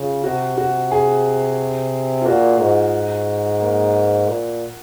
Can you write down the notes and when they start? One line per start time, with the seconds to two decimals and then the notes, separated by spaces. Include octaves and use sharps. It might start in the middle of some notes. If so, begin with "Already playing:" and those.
Already playing: C#3 F4
0.24 C3 F#4
0.57 C3 F#4
0.91 G#4
2.21 F4
2.26 A#2 F#4
2.59 G#2
3.61 A#3
4.28 A#2